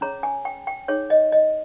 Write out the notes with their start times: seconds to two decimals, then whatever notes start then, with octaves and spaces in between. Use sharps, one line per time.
0.01 C#4 G#4 C#5 A#5
0.23 G#5
0.45 G5
0.67 G5
0.88 D#4 G#4 C#5
1.10 D#5
1.32 D#5